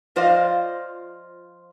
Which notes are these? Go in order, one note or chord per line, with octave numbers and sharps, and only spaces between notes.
F3 F4 C5 D5 D#5 F5